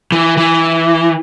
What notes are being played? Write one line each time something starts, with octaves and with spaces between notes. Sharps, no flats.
E3
E3